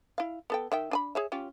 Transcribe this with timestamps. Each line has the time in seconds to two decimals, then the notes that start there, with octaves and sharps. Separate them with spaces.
0.18 E4 F5
0.50 B3 A4 G5
0.72 D#3 E5 G5
0.91 D4 G#5 B5
1.15 G#4 C#5 E5
1.32 C#4 F4 G4